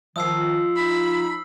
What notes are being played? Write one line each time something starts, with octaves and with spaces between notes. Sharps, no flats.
D#3 F3 D#6 E6 C7
D#4 B5